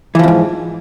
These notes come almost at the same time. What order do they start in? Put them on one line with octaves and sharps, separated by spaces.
E3 F3 E2 G#2